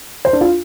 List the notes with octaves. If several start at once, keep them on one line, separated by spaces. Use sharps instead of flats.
C5
D4
F4